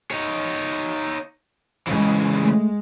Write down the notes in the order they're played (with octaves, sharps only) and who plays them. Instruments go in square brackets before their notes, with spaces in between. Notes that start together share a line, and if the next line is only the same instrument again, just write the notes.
[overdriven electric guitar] D#4 C#5
[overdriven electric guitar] C#3 E3 [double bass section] G#3
[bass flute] A3